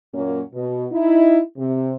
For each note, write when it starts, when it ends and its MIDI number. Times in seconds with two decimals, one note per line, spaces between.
0.14 0.41 42
0.14 0.41 46
0.14 0.41 54
0.14 0.41 58
0.14 0.41 61
0.54 0.86 47
0.92 1.41 63
0.92 1.41 64
1.58 1.95 48